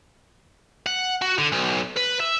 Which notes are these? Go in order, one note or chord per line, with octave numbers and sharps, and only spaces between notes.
F#5
F#4
D3
B1
B4
E5